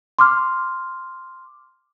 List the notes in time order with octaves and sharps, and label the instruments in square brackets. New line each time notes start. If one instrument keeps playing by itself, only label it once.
[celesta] C6 D6 F6